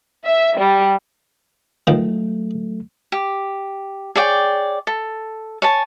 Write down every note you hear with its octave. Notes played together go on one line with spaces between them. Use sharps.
E5
G3
D#3 F3 F#3 A3
G4
G#4 C#5 D5 G5
A4
C#5 G#5 A5